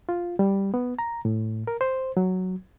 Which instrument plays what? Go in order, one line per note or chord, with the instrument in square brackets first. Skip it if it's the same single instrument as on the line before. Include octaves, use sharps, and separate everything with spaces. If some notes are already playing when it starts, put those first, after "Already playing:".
[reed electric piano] F4
G3
B3
A#5
A2
A#4
C5
F#3